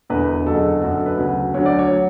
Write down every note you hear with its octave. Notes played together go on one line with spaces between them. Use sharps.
E1 E2 D3 B4
F#1 E2 D3 F#3 A4
G#4
A4
F#1 F#2 D3 F#3 F#4
A4
B4
D2 C#3 F#3
D2 D3 F#3 C#5
D5
C#5
F#3